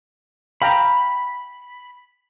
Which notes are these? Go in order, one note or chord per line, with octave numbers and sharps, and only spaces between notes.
F5 G5 A#5 B5